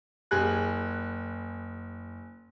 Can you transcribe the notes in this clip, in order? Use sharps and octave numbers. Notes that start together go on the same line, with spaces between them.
F#1 G#4 F#6